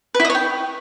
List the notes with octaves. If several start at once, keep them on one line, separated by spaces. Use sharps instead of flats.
B4
E4
D#5
C#5
G5